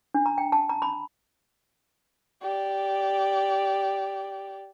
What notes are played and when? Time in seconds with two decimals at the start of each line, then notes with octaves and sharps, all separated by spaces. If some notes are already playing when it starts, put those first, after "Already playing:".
0.14 D4
0.26 A#5
0.38 G5
0.52 A5
0.69 A#5
0.82 B5
2.42 G4 D5